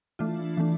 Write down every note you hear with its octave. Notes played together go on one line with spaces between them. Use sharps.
E3 A3 D4 F4
E3 A3 D4